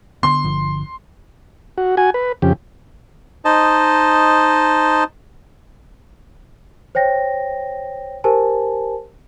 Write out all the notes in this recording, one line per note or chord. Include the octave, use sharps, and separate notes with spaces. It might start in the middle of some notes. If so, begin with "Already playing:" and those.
D3 B3 C6
G1 D3 F3
F#4
F#4 G#5
B4
F2 C#3 G4
D#4 C5 D#5 A5
C5 C#5 G5 A#6
G4 A#4 C5 G#5 A5